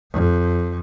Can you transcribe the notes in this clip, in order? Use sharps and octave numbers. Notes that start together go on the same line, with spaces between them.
F2